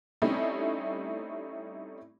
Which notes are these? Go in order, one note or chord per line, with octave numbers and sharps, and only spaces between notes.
G3 A3 C4 C#4 D#4 E4